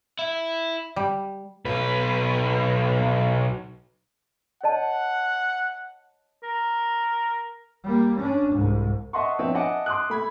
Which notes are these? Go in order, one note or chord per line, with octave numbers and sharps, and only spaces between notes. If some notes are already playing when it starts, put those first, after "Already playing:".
E4
G3
B1 B4
C#5 D#5 F#5 A5
A#4
G3 A#3
C#4 D4
C2 G#2
D#5 E5 F#5 A5 C6 C#6
F3 B3 C4 D4 C#5 E5
D#5 E5 F#5 G#5 A5 D6
C6 D6 D#6 F#6
A3 B5 G#6